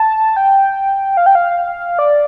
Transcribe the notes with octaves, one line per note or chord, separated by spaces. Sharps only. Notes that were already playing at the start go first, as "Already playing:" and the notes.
Already playing: A5
G5
F5
G5
F5
D5